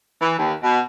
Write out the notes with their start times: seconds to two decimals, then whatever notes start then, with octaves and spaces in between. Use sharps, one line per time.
0.21 E3
0.38 D#2
0.62 B2